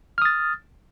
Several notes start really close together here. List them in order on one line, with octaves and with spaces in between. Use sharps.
F6 D#6 A6